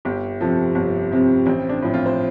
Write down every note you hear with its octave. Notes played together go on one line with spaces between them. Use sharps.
G1 G4
F2 C3 F3 A4
G1
F2 C3 F3
A1 C4
D4
A2 F3
F4
C5